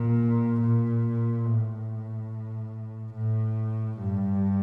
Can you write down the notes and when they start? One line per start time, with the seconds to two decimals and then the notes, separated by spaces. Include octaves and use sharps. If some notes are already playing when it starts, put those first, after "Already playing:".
Already playing: A#2
0.61 A#2
1.45 A2
3.14 A2
3.99 G2